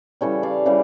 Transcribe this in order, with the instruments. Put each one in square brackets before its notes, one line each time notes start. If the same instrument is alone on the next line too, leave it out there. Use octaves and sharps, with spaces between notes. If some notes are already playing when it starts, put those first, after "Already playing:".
[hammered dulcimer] C#3 E3 G3 A4 C#5
D5 F5
C#3 E3 G3